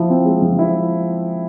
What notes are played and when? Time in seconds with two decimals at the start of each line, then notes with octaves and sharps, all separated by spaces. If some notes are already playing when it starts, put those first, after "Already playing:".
Already playing: F3 E4
0.10 C4
0.25 G#3
0.42 F3
0.59 E4